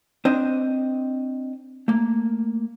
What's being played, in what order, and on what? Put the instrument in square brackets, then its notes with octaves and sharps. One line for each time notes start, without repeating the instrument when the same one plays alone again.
[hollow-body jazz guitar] C4 D4 C5 D#5
A3 A#3